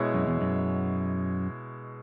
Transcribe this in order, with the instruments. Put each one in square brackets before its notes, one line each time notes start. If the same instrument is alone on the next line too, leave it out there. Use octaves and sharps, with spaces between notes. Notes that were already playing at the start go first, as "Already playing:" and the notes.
Already playing: [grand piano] B2 G#3 E4 C#5
[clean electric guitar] F#2
E2
F#2